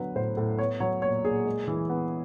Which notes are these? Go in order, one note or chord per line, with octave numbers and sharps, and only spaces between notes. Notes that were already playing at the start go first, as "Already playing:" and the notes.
Already playing: D3 F#3 B3 B4
A2 C5
A2
B3 C#5
F#3 C#5
A#2 C#5
A#2 G#4
G#3
E3
B3